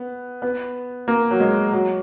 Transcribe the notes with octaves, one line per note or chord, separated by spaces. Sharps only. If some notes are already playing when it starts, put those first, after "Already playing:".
Already playing: B3
B3
A#3
F#3
G#3
F#3